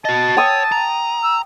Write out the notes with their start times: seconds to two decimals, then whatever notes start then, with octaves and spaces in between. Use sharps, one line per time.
0.05 F#4 D#5 A5
0.37 C#5 G5 D#6 E6
0.72 A#5
1.24 E6